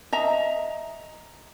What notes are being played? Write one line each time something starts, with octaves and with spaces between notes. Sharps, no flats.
D#5 E5 A#5